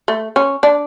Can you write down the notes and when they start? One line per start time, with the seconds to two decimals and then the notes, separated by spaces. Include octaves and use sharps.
0.08 A3
0.36 C#4
0.63 D4